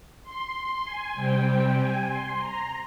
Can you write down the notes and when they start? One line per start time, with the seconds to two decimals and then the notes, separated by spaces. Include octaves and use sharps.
0.23 C6
0.54 C6
0.84 G#5
1.14 C3 G3 C4 G5
1.45 G5
1.76 G#5
2.06 C6
2.37 A#5